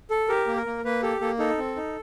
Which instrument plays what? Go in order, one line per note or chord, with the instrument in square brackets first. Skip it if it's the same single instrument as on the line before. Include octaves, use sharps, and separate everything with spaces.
[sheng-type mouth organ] A4
G4 A#4
A#3
A#4
A#3
A#3 B4
G4 A4
A#3 A4
D#4 A4
C4
D#4